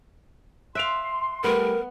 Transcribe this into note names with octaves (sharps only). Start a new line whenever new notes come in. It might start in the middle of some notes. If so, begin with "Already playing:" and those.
E5 F5 C6 F#6 D7 F7
G3 A3 B3 A#4